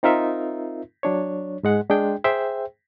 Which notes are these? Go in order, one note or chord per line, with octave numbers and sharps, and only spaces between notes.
C4 D#4 F4 A#4 E5
F#3 D4 C#5
G#2 G#3 F#5
G#3 D4 G#4 G5
G#4 C5 E5 G5